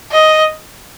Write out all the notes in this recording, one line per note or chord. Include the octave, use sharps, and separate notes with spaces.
D#5